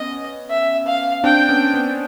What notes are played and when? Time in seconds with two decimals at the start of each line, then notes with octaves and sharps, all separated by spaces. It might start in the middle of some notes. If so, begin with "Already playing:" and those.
Already playing: B3 C#4 D#5
0.50 E5
0.86 F5
1.24 C4 D4 G5
1.49 B3 C#4
1.74 B3